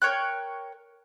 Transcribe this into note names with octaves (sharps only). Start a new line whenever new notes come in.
A#4 C#5 G5 F#6